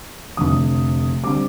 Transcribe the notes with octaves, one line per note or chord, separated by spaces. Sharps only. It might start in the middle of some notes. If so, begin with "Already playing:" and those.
F1 F2 D3 D#6
D3 G3 C4 D6